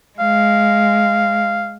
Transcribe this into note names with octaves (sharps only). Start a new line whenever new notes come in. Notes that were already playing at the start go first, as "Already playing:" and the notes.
G#3 F5